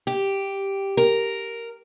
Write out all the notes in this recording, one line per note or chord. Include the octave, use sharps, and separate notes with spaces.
G4
A#4